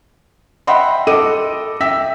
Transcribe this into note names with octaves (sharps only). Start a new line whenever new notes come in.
D#5 E5 F#5 G5 B5 C6
A4 D#5 D6 D#7
E5 G5 E6 B6